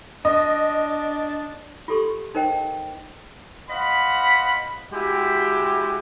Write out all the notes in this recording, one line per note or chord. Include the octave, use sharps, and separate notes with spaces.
D4 D#5
F4 G4 A4 C6 C#6
D#4 A#4 C5 D#5 G5
C5 D#5 F5 F#5 B5
G#3 E4 F#4 G4